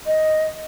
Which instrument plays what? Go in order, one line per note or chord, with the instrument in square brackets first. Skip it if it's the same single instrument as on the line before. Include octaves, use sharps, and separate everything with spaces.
[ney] D#5